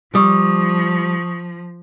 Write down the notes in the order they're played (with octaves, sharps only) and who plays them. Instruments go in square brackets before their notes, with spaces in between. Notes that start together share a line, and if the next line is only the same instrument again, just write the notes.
[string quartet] F3 [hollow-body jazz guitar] G3 [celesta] C#6 D#6